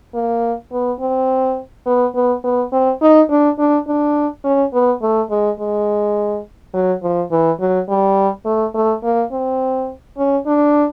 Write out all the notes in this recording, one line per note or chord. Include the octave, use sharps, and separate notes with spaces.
A#3
B3
C4
B3
B3
B3
C4
D#4
D4
D4
D4
C#4
B3
A3
G#3
G#3
F#3
F3
E3
F#3
G3
A3
A3
A#3
C4
C#4
D4